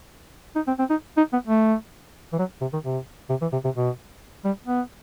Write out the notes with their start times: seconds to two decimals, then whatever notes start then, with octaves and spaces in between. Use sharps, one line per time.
0.56 D#4
0.67 C4
0.79 C4
0.90 D#4
1.17 D#4
1.33 B3
1.47 A3
2.33 E3
2.39 F#3
2.61 C3
2.73 D#3
2.84 C3
3.30 C3
3.42 E3
3.53 C3
3.65 C3
3.76 B2
4.45 G3
4.67 B3